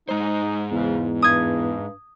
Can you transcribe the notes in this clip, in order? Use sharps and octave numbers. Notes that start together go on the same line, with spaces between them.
G#2 G#3 D#4 C5
E2 C#3
G2 D#6 G#6